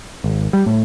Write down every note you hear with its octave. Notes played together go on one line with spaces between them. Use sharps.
G#1
G3
A2